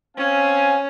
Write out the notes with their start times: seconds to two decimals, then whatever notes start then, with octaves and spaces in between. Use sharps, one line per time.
0.17 C4 C#4 F5 G#5